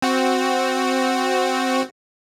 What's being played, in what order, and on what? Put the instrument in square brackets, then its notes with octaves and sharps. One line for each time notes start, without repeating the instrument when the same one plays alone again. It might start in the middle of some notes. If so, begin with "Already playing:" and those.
[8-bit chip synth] C4 F#4